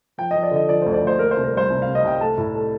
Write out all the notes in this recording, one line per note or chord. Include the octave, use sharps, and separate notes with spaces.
F3 G5
D#5
F3
D5
D3 D#5
F3 D5
C5
D2
D5
D2
C5
A#3 A#4
C5
C2
A#4
G3 C5
C2
F5
C3
D#5
C2 G5
A3 A5
A2
A3